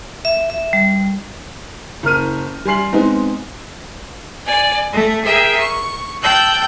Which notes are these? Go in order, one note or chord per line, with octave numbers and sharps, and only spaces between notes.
E5
E5
G3
F#1 A#4 F6 D#7
G3 G#5 C6 C7 F#7
G#3 B3 C4 D#4
D5 G#5
A3
G#4 A#4 E5 G5
C#6
G5 A5 E6 F#6 G6